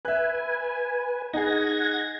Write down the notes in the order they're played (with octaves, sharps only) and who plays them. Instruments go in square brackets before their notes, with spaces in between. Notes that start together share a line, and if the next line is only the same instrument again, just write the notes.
[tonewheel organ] B4 G#5 [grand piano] E5 F#6
[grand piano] D#4 G#4 [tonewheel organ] F#5 G#6 A#6